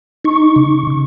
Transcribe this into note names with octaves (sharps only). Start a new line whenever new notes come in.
D#4 C#6
C#3
C#3